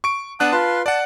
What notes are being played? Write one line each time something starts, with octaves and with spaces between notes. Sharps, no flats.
C#6 D7
B3 D4 F#5 A5 D#6 F#6
F4 B4 A5 C6
D5 F#5 A5